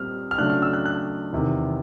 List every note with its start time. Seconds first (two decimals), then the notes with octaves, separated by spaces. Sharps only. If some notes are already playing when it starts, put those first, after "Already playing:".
Already playing: A#2 G3 C4 F6
0.31 F6
0.38 C#3 F#3 A3 D4 F#6
0.50 F6
0.62 E6
0.73 F#6
0.86 F#6
1.33 E2 C3 D#3